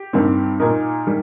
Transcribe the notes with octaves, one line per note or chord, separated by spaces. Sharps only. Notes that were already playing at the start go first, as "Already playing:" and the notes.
Already playing: G4
G2 D#3 G3 C4
A#2 A#3 D#4 A#4
D#3 G3